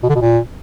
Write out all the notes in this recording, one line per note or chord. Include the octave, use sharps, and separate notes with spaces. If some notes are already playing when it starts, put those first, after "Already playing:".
B2
D3
B2
A#2